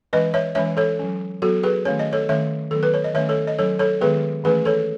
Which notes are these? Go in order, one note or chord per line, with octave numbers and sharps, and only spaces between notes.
E3 G#3 C#4 B4 D#5
C#5 E5
E3 G#3 C#4 C#5 E5
A4 C#5
F#3 C#4
F#3 B3 F#4 A4
G#4 B4
D#3 A3 C#4 C#5
D#5
A4 C#5
D#3 A3 C#4 C#5 E5
D#3 F#3 B3 A4
B4
C#5
D#5
D#3 A3 C#4 C#5 E5
A4 C#5
D#5
F#3 C#4 A4 C#5
A4 C#5
D#3 G#3 B3 G#4 B4
E3 A3 C#4 G#4 B4
A4 C#5